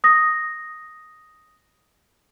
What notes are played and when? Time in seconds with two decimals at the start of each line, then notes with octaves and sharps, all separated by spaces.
0.04 D#6 A#6